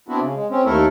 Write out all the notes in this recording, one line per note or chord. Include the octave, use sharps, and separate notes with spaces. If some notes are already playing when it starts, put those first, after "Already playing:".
B3 C4 D4 E4 F#4
C#3
G#3
C4 C#4
D#2 A3 E4 A4 A#4